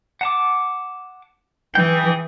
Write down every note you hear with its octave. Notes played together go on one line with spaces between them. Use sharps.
F#5 A5 D6
E3 G#4 G5